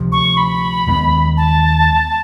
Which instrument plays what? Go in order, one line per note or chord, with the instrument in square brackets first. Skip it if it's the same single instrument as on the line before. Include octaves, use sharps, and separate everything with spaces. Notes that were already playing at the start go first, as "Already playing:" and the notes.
Already playing: [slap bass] D2 C3 F3
[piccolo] C#6
B5
[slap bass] D#2 D#3 G#3 B3
[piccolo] A5